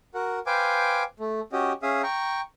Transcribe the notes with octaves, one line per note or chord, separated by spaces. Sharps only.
F#4 A#4 F#5
B4 C5 F5 G5 G#5 D6
A3
C#4 F#4 G4 D#5
C#4 G#4 E5 F5 D#6
G5 A#5 C#6